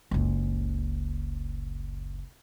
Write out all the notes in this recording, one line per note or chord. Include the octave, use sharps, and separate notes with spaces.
F#1 C#2